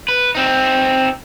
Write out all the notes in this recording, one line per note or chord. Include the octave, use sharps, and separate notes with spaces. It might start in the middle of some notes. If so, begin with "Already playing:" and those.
B4
C4 D#4